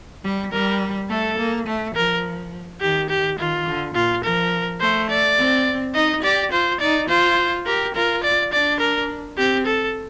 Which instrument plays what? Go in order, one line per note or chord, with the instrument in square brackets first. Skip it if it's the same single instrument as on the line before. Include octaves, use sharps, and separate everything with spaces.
[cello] G3
[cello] G3 [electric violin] A#4
[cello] A3 [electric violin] A4
[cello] A#3
A3
[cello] F3 [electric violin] A#4
[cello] D#3 [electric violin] G4
[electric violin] G4
[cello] D#3 [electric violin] F4
[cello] D3
[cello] A#2 [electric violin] F4
[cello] F3 [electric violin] A#4
[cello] A3 [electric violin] C5
[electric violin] D5
[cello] C4
[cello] D#4 [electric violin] D#5
[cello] G4 [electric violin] D5
[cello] F4 [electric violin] C5
[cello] D#4 [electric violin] D5
[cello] F4 [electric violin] C5
[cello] G4 [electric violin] A#4
[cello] F4 [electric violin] A#4
[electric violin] D5
[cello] D4 [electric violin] D5
[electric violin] A#4
[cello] C4 [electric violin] G4
[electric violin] A4